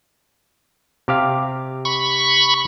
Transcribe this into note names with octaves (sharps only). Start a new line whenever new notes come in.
C3 G4 F5
B5 C#6